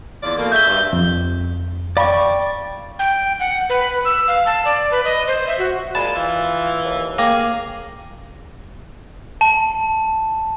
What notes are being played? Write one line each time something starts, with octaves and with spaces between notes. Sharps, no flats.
E2 F4 D5
B2 A3 A#3
C#3 G#3 E5 G6 G7
G2
F2
D5 F5 G5 B5 C#6
G5
F#5
B4
E6
F5
A5
D5
B4
D#5
C5
E5
F#4
A#2 G#3 A5 B5 A6
E3 F4
D#2
A#3 G#4 G5 D6 A#6
A5